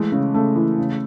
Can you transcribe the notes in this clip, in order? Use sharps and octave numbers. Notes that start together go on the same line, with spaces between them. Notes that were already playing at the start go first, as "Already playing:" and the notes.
Already playing: E3 G#3 A3
C#3
C#3 A3
E3
C#3